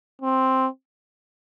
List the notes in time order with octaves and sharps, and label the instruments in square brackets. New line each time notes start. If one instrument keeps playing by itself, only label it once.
[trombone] C4